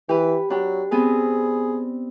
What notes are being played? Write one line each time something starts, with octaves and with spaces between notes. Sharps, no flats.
E3 G4 B4
F#3 D4 G4
B3 C4 G#4 B4